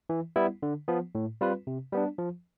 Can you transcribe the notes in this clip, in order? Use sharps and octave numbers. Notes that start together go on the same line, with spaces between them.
E3
G3 B3 E4
D3
F3 B3
A2
G3 C4 F4 B4
C3
G3 B3 D4
F3